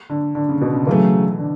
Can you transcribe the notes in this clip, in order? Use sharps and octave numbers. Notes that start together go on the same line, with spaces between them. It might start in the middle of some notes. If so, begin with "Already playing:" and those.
D3
D3
C#3
B2
C#3
C#3 E3 F#3 A3
D3